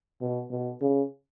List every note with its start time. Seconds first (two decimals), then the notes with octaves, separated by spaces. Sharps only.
0.21 B2
0.50 B2
0.81 C#3